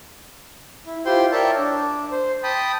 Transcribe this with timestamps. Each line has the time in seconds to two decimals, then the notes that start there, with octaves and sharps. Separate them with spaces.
0.86 E4
1.06 E4 F4 G4 C5 G5 C6
1.32 A#4 C#5 D5 E5 G5 A5
1.58 D4
2.11 C5
2.43 G5 A5 B5 D#6